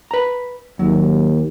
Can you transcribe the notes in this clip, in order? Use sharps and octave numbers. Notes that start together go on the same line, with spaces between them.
B4 A#5
D#2 F#3